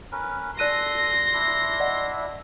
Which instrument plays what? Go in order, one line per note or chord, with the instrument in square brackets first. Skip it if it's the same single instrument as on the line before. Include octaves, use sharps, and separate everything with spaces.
[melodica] C#4 A#4 B4
[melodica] A4 [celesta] D5 F#6 D#7 [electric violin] C6 A#6
[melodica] D4 E4 E5
[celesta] D5 D#5 F#5